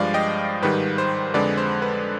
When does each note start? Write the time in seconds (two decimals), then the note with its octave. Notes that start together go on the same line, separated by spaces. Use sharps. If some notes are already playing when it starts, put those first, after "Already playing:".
Already playing: G2 F3 G#3 D5 F5
0.14 D#5 G5
0.62 G#2 D#3 G3 B4
0.98 C5
1.34 F2 D3 G#3 B4 D5
1.58 C5
1.82 B4